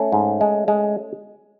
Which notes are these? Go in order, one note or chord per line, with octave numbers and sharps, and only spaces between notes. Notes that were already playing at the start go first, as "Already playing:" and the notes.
Already playing: A3 C#4
G#2
G#3
G#3